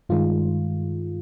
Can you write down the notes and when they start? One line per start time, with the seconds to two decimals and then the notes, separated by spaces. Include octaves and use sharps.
0.09 G2 D#3 G#3 F4